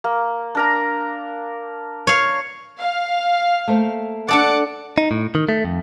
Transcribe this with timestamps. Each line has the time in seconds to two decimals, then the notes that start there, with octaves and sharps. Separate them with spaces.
0.04 A#3
0.55 D4 A#4 A#5
2.07 C#5 F5
2.80 F5
3.68 A3 A#3 C5
4.28 D4 A4 D5 F#5 D6 C#7
4.98 D#4
5.11 A2
5.35 D#3
5.49 A3
5.65 F2